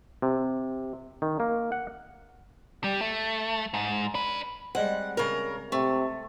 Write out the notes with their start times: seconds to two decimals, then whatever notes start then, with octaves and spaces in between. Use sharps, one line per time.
0.22 C3
1.22 D#3
1.40 A#3
1.72 F#5
2.84 G3
3.01 A3
3.74 G#2
4.14 D4 B4
4.75 G3 G#3 C4 F#5
5.17 C#3 A#4
5.72 C3 A3